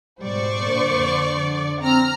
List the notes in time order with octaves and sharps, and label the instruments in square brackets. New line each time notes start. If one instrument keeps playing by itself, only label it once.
[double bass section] G#2 B2 G3 [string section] C5 D5 C#6
[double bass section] A#2 D3 A#3
F2 D3
[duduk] C4 [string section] A#5 F6